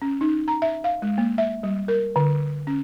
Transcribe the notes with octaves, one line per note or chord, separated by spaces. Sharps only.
C#4
D#4
A#5
E5
F5
G#3
A#3
E5
G3
A#4
D3
C#4